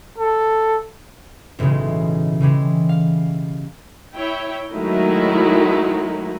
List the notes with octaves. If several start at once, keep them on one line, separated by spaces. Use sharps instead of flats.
A4
B1 A2 C#3 E3 G#3
C#3 E3 G3 G#3
F5
E4 C#5 G5
D#3 F#3 G#3 A3 D#4 E4